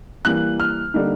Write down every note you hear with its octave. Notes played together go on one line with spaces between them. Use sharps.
E3 G3 A#3 F#6
F6
D3 G3 A#3 D#4